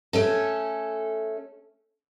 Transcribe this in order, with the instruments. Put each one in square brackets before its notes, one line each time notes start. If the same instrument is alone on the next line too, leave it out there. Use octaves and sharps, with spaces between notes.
[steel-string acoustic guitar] A3 C#4 A4